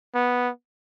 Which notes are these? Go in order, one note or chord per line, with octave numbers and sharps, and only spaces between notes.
B3